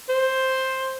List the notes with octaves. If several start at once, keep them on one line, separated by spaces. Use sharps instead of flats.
C5